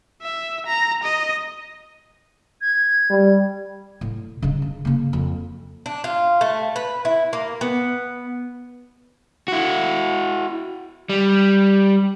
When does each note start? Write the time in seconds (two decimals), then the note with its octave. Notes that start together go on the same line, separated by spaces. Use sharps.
0.22 E5
0.67 A#5
1.04 D#5
2.61 G#6
3.10 G3
4.01 A2
4.42 C#3 D#4
4.62 C#3
4.85 C#3 A#3
5.13 F2
5.86 D4
6.04 F4
6.41 A3
6.76 B4
7.05 E4
7.33 A#3
7.61 B3
9.48 E4 F#4
11.09 G3